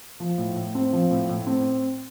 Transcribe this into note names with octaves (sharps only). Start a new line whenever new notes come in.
F3
A2
A2
C4
F3
A2
A2
C4